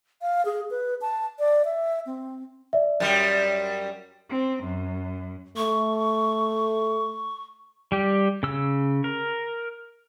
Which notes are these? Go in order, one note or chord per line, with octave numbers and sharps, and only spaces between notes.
F5
G#4
B4
A5
D5
E5
C4
D5 E5
F#2 G3
C4
F#2
A3 C#6
G3 G4
C#3 E6
A#4